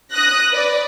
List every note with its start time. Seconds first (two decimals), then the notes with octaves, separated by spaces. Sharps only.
0.12 D#6 F#6 A#6
0.51 B4 D5